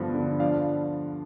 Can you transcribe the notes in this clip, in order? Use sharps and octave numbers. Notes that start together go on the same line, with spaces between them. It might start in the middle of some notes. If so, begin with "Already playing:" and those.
Already playing: G2 D3 F3 B3
D3
F3 D5 F5